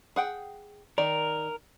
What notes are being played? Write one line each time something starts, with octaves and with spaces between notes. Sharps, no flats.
G#4 F#5 G5
D#3 A#4 D5